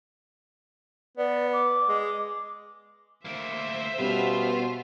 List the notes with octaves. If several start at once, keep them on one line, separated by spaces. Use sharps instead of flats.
B3 D5
D6
G#3
D6
D2 A#3 C5 E5
B2 G3 B3 C#4 F4